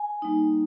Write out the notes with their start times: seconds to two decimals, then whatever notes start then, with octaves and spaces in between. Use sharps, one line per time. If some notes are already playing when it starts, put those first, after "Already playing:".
Already playing: G#5
0.22 G3 A#3 D#4